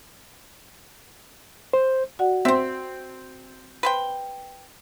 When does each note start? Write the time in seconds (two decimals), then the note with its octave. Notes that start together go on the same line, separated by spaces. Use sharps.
1.73 C5
2.19 F#4 D5 F#5
2.45 C4 C5 E5
3.83 B4 C5 G5